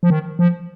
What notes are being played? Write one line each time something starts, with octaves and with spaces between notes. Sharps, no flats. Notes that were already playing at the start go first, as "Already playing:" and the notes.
F3
D#3
F3